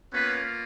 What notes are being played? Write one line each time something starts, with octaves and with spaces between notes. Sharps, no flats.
A#3 B3 C#4 F4 B4